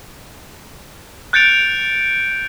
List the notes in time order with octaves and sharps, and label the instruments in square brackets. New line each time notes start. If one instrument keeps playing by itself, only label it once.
[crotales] F#6 G6 A6 C#7 D7 F7